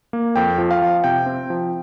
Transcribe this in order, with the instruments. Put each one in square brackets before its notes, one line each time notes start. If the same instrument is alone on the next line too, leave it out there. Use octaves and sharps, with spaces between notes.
[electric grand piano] A#3
F2 G5
F3
F5
F3
C3 G5
C4
F3